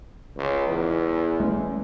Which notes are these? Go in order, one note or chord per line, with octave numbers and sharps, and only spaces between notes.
C#2
E2
G#3 A3 C#4